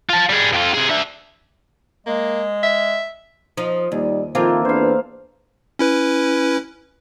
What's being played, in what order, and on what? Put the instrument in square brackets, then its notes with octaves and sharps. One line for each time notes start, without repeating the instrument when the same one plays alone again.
[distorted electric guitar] F4 A5
G3 G#4
F2 F4
C3 G#4
D3 E5
[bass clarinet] G#3 [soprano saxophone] A#3
[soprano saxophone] E5
[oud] F3 D#4 [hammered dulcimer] D#5
[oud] D#2 [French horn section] G3 D#4 D5
[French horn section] D#3 F3 [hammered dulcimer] A#3 E4 A4 [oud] C4 F4
[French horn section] E2 D4 B4 [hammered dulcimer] C5 F5
[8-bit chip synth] C#4 E4 B4